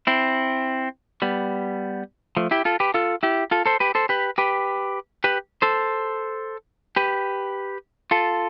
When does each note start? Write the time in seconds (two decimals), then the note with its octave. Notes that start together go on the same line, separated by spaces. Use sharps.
0.07 C4 E4
1.22 G3 B3
2.37 F3 A3
2.51 E4 G4
2.65 F4 A4
2.80 G4 B4
2.94 F4 A4
3.23 E4 G4
3.51 F4 A4
3.66 A4 C5
3.80 G4 B4
3.95 A4 C5
4.09 G4 B4
4.38 G4 B4
5.24 G4 B4
5.62 A4 C5
6.96 G4 B4
8.11 F4 A4